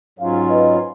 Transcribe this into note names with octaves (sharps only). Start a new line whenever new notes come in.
G#2 F#3 C#4 F4 C#5 F5
B4 D#5